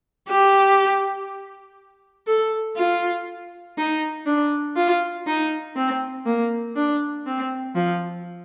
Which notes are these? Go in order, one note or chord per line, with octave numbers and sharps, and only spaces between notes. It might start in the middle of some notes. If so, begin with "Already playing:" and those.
G4
A4
F4
D#4
D4
F4
D#4
C4
A#3
D4
C4
F3